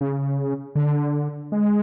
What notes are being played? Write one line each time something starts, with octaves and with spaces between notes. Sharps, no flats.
C#3
D3
G#3